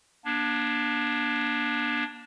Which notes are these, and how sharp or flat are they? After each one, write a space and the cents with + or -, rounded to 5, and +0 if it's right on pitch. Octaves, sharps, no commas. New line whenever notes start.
A#3 +40 D4 +0